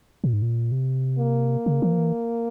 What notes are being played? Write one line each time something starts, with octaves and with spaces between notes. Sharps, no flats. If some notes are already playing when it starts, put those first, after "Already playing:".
A#2
G#2
A#2
C3
A#3
C#3
E3
F3
E3